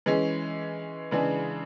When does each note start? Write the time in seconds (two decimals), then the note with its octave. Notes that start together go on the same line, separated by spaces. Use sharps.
0.06 E3 G#3 C#4
1.11 C#3 E3 G#3 D4 G#4